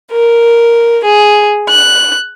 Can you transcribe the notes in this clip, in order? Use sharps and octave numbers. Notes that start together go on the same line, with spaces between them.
A#4
G#4
F#6